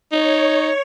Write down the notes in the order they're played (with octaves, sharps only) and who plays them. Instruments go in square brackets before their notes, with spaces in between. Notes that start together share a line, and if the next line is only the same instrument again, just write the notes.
[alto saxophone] D#4 [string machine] C#5